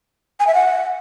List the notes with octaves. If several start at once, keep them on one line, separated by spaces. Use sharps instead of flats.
G#5
E5
F#5